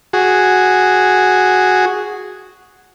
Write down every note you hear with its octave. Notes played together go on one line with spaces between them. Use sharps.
F#4 G#4